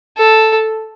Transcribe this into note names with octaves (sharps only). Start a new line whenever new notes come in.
A4